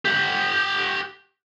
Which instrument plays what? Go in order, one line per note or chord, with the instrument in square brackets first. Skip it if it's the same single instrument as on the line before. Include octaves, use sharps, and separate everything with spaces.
[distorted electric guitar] G4 F#5